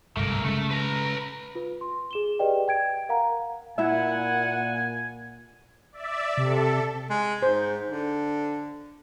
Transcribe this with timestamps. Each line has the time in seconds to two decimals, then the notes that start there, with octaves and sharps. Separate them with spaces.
0.17 G1 C2 G#2 A3 A#4
0.45 C#3 G#3 A3
0.71 B4 A#5
1.55 F4 B4
1.81 C6
2.11 G#4 E7 G7
2.39 G4 G#4 B4 D5 D#5 G5
2.68 G5 G#6 D7
3.09 A#4 F5 F#5 A#5
3.78 A#2 E4 E5 F#5 G#5
5.92 D5 E5
6.37 C3 A4
7.10 G#3
7.42 G#2 C5
7.89 D3